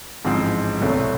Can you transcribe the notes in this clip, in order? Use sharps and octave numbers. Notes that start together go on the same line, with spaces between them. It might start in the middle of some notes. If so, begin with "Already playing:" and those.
A1 G#2 F3 G#3 C4
C2 B2 F#3 A3 C4